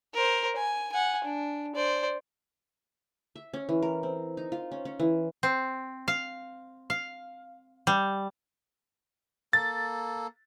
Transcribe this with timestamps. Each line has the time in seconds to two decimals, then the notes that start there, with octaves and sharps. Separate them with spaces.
0.14 A#4 C5
0.56 G#5
0.93 F#5 G#5
1.24 D4
1.75 C5 D5
3.36 E5
3.54 C#4
3.69 E3
3.83 A#4
4.03 C4
4.37 D#4
4.52 F4
4.72 C#4
4.85 C#4
5.00 E3
5.43 C4
6.08 F5
6.90 F5
7.87 G3
9.53 A#3 A4 A6